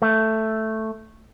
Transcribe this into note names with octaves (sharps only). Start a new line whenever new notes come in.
A3